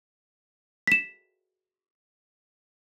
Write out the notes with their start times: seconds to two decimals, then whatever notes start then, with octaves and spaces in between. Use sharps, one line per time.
0.87 B6 E7